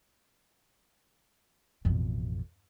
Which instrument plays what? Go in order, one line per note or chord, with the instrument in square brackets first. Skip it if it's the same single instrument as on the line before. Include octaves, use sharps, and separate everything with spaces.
[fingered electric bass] A1 B2 [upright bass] F2